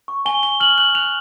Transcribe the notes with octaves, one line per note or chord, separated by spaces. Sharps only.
C#6
G#5 G7
G#5 G7
F6 F#7
F#6 F#7
F#6 F7